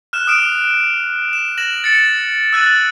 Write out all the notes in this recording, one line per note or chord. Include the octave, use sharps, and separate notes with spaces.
F6 F#6 E7
D#6 F6 D7 E7
E7
A#6 E7 F#7
A6 C#7
E6 F#6 A6 D#7